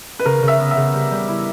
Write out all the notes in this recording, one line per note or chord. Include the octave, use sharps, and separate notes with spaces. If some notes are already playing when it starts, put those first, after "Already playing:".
B4
C#3 A#4
C#3
E5
B3
E5
C#3
G3
G3
E4